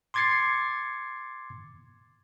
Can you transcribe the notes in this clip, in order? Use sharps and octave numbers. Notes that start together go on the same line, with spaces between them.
C6 D6 G#6 A6 C7 C#7